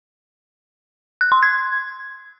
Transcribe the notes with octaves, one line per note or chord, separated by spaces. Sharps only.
F#6
C6
G#6